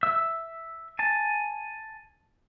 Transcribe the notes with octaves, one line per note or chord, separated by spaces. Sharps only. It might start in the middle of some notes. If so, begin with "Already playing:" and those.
E5 E6
G#5 A5